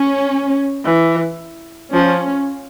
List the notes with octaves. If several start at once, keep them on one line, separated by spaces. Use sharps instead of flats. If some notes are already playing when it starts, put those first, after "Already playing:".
Already playing: C#4
E3
F3 C#4